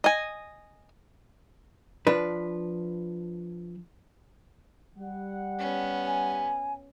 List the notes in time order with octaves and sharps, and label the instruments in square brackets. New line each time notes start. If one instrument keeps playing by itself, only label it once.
[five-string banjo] D#5 G#5
[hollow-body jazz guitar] F3 D4 B4
[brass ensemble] G3 F#5
[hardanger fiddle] B3 C#4
[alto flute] G#5